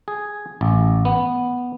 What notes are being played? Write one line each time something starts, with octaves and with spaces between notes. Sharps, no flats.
G#4
A1
B3